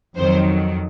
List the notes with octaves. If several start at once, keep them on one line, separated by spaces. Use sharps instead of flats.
F2 D#3 F#3 C5